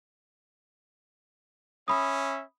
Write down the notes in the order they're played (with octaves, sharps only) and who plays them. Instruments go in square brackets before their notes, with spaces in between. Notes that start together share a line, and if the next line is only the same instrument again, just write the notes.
[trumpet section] C#4 E5 [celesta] B5 D#6